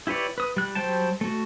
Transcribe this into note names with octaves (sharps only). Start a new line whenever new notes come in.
E4 G4 B4 C#5 D5
B4 D#6
G3 F#6
F#3 G3 C5 G5 A5
A3 F#4